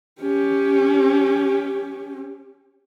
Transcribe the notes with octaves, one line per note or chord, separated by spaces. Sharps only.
C#4 G4